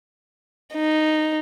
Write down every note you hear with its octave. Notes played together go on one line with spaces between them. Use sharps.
D#4